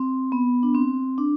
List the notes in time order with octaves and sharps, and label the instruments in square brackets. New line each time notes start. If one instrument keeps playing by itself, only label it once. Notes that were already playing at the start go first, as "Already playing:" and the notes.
Already playing: [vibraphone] C4
B3
D4
C4
D4